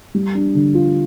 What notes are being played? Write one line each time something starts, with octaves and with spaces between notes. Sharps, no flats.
G3
D4
D3
F4